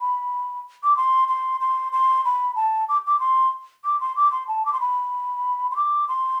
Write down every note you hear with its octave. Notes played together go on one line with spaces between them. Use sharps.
B5
D6
C6
C6
C6
C6
B5
A5
D6
D6
C6
D6
C6
D6
C6
A5
D6
C6
B5
C6
D6
C6